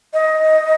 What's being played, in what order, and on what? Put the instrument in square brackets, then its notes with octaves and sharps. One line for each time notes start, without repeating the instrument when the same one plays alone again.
[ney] D#5